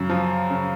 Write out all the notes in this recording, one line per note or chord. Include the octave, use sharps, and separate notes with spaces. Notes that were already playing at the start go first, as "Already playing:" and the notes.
Already playing: F#2 C#3
F3
C#3